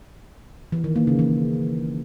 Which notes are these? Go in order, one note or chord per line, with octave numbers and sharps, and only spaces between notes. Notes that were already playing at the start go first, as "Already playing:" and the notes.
E3
D#3
A#3
C#3
E3